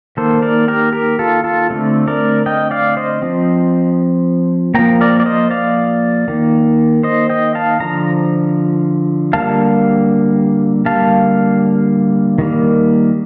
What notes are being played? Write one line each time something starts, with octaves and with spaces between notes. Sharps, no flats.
D#3 A#3 A4 C5
A#4 D5
G4 A#4
G4 A#4
F4 A4
F4 A4
D3 A3 C4
A#4 D5
D#5 G5
D5 F5
C5 D#5
F3 C4
F3 A#3 G5 A#5
A#4 D5
D5
C5 D#5
D5 F5
D#3 A#3
C5 D#5
D#5 G5
F5 A5
D3 F3 A#5
D3 G3 A#3 F5 A5
D3 G3 A#3 F5 A5
D#3 G3 A#3